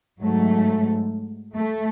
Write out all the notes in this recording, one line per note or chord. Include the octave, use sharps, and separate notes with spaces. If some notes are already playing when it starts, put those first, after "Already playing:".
G#2 F#3 A3
A3